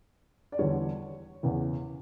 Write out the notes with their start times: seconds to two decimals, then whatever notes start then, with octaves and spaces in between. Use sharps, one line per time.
0.52 D5
0.59 E2 D3 G3 C#5
1.43 E2 C#3 E3